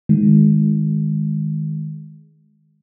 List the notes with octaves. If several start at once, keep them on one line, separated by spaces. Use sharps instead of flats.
D#3 G#3